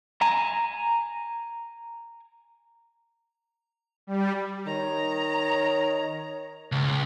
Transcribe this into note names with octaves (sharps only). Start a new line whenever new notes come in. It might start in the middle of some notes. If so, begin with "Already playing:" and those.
G#5 A#5
G3
D#3 C#5 A#5
C#2